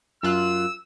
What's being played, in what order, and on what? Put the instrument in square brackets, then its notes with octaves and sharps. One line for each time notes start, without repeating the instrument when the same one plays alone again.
[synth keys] F#2 F4 F#6 [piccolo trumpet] E6